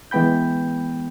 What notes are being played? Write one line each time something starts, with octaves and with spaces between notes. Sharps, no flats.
E3 G#3 B3 G5 B5 G6